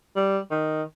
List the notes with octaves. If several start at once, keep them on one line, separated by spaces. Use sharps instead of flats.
G3
D#3